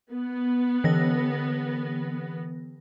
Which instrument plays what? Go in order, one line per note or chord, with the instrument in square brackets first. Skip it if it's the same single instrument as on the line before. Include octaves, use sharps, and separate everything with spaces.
[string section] B3
[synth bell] D3 E3 A#6